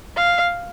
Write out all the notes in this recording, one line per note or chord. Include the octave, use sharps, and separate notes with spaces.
F5